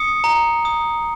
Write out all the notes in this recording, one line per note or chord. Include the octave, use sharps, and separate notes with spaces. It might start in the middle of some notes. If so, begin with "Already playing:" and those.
Already playing: D#6 C#7
A#5
D#6